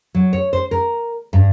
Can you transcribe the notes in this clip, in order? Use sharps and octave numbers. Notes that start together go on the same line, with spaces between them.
F#3
C#5
C5
A#4
G2